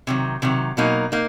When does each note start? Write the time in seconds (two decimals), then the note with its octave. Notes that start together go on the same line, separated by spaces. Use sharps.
0.07 C3 D#3 F#3
0.42 C3 D#3 F#3
0.77 B2 F#3 A#3 D#4
1.12 A#3 D#4